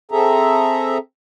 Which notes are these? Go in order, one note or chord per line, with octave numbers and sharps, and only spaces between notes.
C4 G#4 A4 E5 A#5